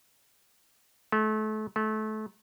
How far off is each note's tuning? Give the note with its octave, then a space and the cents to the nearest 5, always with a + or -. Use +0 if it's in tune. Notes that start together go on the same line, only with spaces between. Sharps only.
A3 -30
A3 -25